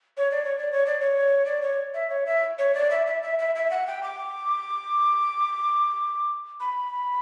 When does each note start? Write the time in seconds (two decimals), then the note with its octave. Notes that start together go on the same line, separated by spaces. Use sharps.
0.17 C#5
0.31 D5
0.45 C#5
0.59 D5
0.72 C#5
0.86 D5
1.00 C#5
1.45 D5
1.62 C#5
1.94 E5
2.10 C#5
2.26 E5
2.58 C#5
2.74 D5
2.90 E5
3.07 E5
3.23 E5
3.39 E5
3.55 E5
3.70 F#5
3.87 G5
4.03 D6
6.60 B5